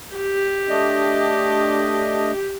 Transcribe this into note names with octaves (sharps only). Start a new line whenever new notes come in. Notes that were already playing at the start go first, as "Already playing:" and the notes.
G4
A3 D4 D#5